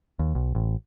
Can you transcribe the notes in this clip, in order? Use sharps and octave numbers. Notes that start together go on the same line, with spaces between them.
D#2
B1
A1